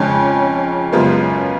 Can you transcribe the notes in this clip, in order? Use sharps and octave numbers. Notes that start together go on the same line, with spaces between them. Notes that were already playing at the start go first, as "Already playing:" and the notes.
Already playing: F2 C#3 G#3 C#4
F#2 C#3 G#3 B3 F4
C#4